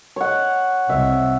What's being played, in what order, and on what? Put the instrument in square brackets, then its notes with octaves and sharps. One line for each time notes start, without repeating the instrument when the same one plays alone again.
[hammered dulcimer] C#5 F#5
[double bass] C2 [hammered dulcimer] E5